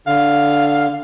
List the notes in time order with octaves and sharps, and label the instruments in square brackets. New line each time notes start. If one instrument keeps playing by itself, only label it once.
[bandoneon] D3 [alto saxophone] F5